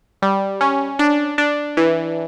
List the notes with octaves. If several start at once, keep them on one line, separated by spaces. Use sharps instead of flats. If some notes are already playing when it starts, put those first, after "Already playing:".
G3
C#4
D4
D4
E3